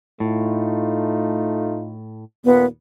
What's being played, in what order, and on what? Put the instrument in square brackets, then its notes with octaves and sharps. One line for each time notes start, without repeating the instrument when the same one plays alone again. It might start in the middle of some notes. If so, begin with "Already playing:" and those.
[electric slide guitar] A2 [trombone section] A3 D#4 F4
[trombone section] D#2 A#2 [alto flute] B3